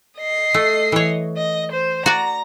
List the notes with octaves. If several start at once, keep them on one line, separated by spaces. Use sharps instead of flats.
D#5 C7
A3
E3 C#5
D#5
C5
F#4 D5 A#5